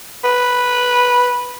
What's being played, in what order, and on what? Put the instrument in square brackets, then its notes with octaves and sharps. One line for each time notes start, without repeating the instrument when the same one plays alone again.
[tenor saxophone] B4